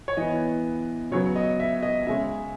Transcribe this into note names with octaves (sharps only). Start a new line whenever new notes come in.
C#5
E3 B3 D#5
C#3 F#3 B3 C#5
D#5
E5
D#5
C#3 G#3 C#4 E5